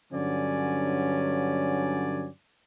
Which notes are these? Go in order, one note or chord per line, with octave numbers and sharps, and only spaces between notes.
G2 D3 F#3 C#4 D5 G#5